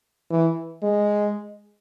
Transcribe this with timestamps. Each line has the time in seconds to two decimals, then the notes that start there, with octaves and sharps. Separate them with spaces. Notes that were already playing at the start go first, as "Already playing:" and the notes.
0.30 E3
0.82 G#3